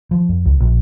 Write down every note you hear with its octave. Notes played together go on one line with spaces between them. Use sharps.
F3
F2
C#2
A#1